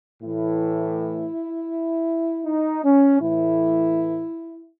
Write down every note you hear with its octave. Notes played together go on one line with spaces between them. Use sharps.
A2 E3 E4
D#4
C#4
A2 E3 E4